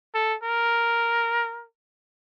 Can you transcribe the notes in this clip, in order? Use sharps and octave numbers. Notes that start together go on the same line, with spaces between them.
A4
A#4